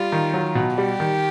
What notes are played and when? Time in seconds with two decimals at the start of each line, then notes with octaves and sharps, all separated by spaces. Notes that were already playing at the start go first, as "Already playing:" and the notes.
Already playing: G3 F4
0.12 D#3
0.33 F#3
0.55 B2
0.77 G3 G4
1.00 D#3